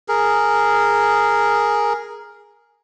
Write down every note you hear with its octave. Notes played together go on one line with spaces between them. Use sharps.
G#4 A#4